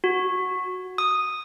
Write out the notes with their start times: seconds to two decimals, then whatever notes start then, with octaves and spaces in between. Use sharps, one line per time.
0.04 F#4
0.98 D#6